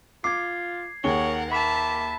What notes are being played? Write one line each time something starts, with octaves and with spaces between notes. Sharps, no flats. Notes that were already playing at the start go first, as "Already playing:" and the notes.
F4 D6 G#6 C7
D#2 G#4 A#4 C#5 F#5 G7
A#3 E5 A5 B5 B6 E7